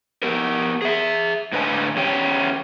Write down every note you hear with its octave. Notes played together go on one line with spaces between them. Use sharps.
B3 G4 A#4
G#4 E5
A2 D3 B4 D#5 G#5
E2 C#4 G4